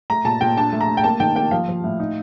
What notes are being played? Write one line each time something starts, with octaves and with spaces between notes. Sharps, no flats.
A3 A#5
A#2 A5
A#2 G5
D4 A5
A3
A#5
A3
G5
A#3 A5
D#3 G5
A#3 G5
F3 F5
F3
A2
D#4